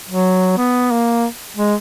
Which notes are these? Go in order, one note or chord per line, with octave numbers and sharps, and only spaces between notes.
F#3
B3
A#3
G#3